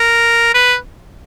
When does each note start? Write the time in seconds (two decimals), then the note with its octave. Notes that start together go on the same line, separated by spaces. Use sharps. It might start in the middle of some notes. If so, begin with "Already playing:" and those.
Already playing: A#4
0.54 B4